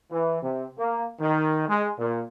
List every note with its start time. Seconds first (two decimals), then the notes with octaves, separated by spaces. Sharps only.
0.11 E3
0.42 C3
0.78 A#3
1.20 D#3
1.69 G#3
1.98 A#2